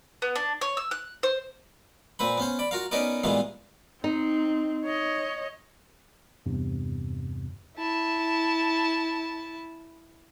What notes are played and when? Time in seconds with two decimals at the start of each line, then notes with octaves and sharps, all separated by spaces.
0.22 B3
0.36 D4
0.61 C#5
0.77 E6
0.91 F#6
1.23 C5
2.19 A#2 C4 B4 B5
2.37 B3 C#4 C5
2.59 D5 B5
2.71 F4 F#4 A#4 F5
2.91 B3 C#4 D#4 A#4 B4 D5
3.23 A#2 E3 G3 G#3 A#3 B3
4.04 C4 D#4
4.85 C#5 D#5
6.46 E2 G2 C3
7.77 E4 A5